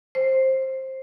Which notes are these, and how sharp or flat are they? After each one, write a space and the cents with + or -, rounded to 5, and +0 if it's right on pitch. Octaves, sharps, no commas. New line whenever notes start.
C5 +15